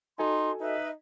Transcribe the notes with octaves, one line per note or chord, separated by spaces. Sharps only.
D#4 F#4 A4 G#5 C6
D#4 B4 D#5 E5